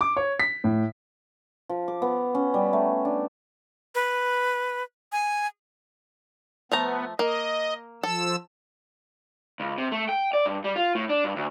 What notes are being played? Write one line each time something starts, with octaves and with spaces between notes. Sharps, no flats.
D6
C#5
B6
A2
F3
D6
B3
C#4
G3
A3
D4
B4
G#5
F3 A3 B3 A#5
A#3 D#5
F3 A4 E6
C#2
C3
A3
G5
D5
G2
G3
F4
A2
D4
G2
D2